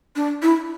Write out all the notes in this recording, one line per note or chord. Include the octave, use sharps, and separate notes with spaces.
D4
E4